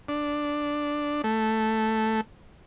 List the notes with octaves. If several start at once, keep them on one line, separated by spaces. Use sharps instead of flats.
D4
A3